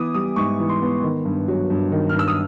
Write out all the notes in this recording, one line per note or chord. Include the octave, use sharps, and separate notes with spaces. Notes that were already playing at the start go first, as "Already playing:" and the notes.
Already playing: E3 B3 D6 D#6
G3 D#6
G#2 C#6
E3
C6
B3
D#3
G2
F#3
G2
D#3
F6
G2
E6
D#6